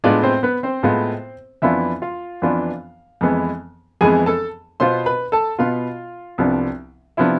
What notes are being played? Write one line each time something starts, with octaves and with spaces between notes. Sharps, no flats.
A2 G#3 B3 D4 F4 D5
C4 C5
B3 B4
C4 C5
A2 G#3 B3 F4
F2 E3 B3 D4 E4 F4 E5
F4 F5
F2 E3 B3 D4 F4
F2 E3 G#3 B3
F2 E3 G#3 B3 G#4 G#5
A4 A5
B2 B3 F4 C5 C6
B4 B5
A4 A5
B2 B3 F4 F5
C2 C3 F3 B3 D4
C3 F3 B3 D4 E4 E5